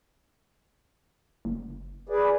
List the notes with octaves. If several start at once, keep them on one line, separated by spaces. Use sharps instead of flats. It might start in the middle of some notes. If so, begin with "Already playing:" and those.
F#1
G#4 B4 D5